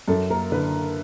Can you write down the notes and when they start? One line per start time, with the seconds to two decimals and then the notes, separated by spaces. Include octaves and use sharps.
0.08 F#2 A4
0.30 A#3 A#4
0.51 D3 B4